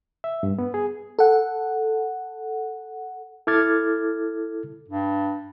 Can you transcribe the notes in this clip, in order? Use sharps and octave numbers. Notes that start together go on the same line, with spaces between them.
E5
G2
B3
G#4
A4 F#5
E4 A4 D6 F6 G#6 A6
G2